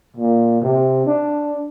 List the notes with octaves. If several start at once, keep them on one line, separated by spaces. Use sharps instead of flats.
A#2
C3
D4